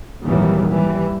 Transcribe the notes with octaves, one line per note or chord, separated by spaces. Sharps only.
G#1 D#2 A#2 E3 F#3 G3
E3 G3